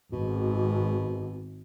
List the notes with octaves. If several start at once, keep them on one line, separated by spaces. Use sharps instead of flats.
G#1 B2